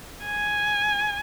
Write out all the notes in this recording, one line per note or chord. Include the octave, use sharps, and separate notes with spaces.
G#5